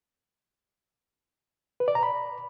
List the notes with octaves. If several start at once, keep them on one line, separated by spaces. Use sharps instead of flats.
B4
D5
A#5
B5